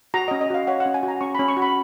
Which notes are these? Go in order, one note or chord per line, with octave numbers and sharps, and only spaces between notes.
F#4 A#5
D#5
C#4
D#5
F#4 F5
C#5 F#5
F#5
C#4
G#5
F#4
A#5
C#4 C#6
B5
C#4
C#6
F#4
B5